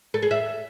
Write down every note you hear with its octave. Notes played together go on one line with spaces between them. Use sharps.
A4
G#4
E5